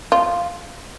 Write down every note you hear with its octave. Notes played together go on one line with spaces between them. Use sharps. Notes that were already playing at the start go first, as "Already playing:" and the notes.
F4